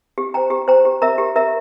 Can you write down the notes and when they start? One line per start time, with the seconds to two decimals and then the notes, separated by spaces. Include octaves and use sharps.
0.18 G4
0.34 C5 G5 A#5
0.50 G4
0.68 C5 G5 A#5
0.85 G4
1.02 A#4 E5 A#5
1.18 G4
1.36 A#4 E5 A#5